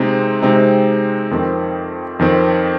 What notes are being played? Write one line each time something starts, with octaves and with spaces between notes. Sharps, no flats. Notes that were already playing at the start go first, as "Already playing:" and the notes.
Already playing: C3 G#3 C4 D#4
C3 G#3 C4 D#4
F2 D#3 C4
F2 D#3 C4